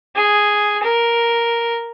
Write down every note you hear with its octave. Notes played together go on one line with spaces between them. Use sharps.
G#4
A#4